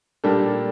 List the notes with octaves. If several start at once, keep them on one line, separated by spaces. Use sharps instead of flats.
A#2 G3 A#3 D4 A4